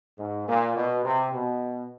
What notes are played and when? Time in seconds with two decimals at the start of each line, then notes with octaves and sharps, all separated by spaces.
0.19 G#2
0.48 A#2
0.76 B2
1.04 C3
1.32 B2